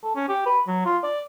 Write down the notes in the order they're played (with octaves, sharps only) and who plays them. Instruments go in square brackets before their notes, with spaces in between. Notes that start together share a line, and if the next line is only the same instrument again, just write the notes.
[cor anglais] A4
C#4
G4
B4
F#3
F4
D5